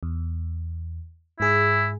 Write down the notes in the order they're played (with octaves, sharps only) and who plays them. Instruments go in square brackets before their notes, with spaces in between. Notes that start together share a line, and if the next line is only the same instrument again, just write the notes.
[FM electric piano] E2
[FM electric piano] G#2 G#4 [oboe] E4